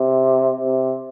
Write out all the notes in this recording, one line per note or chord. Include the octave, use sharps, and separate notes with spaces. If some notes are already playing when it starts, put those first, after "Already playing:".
Already playing: C3
C3